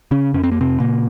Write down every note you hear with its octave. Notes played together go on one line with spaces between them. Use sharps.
C#3 C#4
F2 C#4
C4
A#3
C3 C4
A#2 C#3 A#3